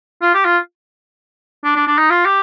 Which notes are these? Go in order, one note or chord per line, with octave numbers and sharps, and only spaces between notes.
F4
G4
F4
D4
D4
D4
D#4
F4
G4